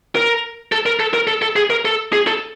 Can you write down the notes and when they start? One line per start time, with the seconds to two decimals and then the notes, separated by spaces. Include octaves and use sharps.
0.15 A#4
0.72 A4
0.86 A#4
1.00 A4
1.14 A#4
1.27 A4
1.42 A4
1.56 G#4
1.70 A#4
1.85 A4
2.13 G#4
2.27 A4